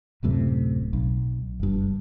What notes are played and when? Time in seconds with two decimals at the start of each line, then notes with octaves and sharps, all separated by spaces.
0.23 D1 F#2 A2 C3
0.93 B1
1.60 F#1 G2